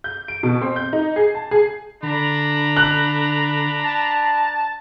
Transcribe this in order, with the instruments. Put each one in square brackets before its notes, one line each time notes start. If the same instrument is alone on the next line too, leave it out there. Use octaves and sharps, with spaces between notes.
[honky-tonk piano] G6
D7
B2
C4
G6
D#4
G#4
A5
G#4
[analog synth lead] D3 [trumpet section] D4 A#5 B5
[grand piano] F#6
[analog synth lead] A5